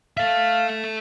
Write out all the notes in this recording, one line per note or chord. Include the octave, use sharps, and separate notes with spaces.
A4 E5 F5